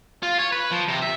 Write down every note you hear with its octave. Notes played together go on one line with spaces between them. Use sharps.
F4
C#5
B4
F3
C3
E5